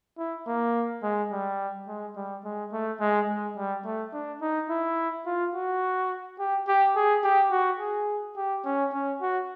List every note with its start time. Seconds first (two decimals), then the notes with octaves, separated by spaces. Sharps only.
0.18 E4
0.47 A#3
1.03 G#3
1.32 G3
1.88 G#3
2.16 G3
2.45 G#3
2.73 A3
3.00 G#3
3.29 G#3
3.57 G3
3.85 A3
4.13 D4
4.41 D#4
4.70 E4
5.27 F4
5.54 F#4
6.39 G4
6.68 G4
6.96 G#4
7.24 G4
7.51 F#4
7.80 G#4
8.37 G4
8.65 C#4
8.93 C#4
9.21 F#4